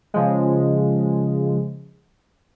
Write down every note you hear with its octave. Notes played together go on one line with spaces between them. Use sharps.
C#3 F3 G#3